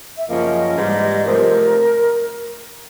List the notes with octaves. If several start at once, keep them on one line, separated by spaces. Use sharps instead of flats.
E5
F#2 C#3 F3 A#3 C#4 D#5
G#2 E3 G3
C3 F3 A3 A#4